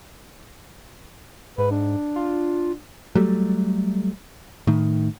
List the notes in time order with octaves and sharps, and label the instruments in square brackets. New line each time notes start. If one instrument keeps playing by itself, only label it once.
[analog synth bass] G#2 [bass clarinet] B4
[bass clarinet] D4
[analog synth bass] F4
[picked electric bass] F#3 G3 A3
A2 D#3